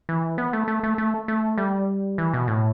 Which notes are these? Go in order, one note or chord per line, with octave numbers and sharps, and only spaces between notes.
E3
B3
A3
A3
A3
A3
A3
G3
E3
B2
A2